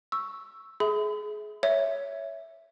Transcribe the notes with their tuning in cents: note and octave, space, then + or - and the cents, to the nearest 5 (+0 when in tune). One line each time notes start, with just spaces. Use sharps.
C#6 +0 E6 +0
G#4 +25 E5 -20 B5 +45
C#5 +10 E5 +0